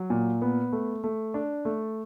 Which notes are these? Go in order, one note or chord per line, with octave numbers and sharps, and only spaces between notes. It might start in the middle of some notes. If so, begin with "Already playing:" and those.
Already playing: F#3
A#2
B3
A3
A3
D4
A3